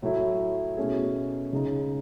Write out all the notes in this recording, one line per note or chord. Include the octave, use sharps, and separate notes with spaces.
A2 F#3 A3 E4
B2 A3 C#4 G#4
C#2 C#3 G#3 D#4